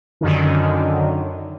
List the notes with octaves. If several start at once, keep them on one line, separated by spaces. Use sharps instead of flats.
F#2 D3 D#3